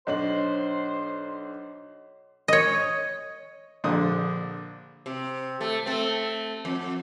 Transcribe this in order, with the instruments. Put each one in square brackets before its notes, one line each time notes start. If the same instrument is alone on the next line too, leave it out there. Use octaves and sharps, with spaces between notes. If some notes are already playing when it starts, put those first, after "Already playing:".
[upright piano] B1 D4 F#7 [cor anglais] C5 [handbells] C#5 D#5
[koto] C#5 D#5
[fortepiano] A#1 D3 C5 D#6
[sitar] C3
A3
A3 C4
F2